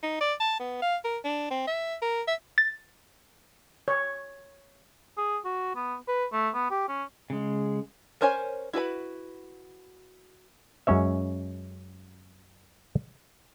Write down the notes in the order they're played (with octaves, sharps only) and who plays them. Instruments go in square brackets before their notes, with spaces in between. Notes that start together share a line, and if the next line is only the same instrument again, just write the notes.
[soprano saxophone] D#4
D5
A5
B3
F5
A#4
D4
C4
E5
A#4
E5
[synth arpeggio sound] A6
[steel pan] C#5
[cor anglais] G#4
F#4
B3
B4
A3
B3
G4
C#4
[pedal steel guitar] C#3 G#3
[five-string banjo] C#4 A#4 C5 C#5 G#5
E4 F#4 B4 B5
[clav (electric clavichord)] F#2 G#3 C#4 C#5 E5